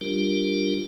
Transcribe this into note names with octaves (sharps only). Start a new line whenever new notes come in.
G3 D4 F4 G4 A#4